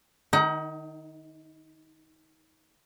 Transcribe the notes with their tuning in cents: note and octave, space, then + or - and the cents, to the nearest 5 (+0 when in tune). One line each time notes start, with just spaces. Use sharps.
D#3 -25 D#4 +30 F#5 +35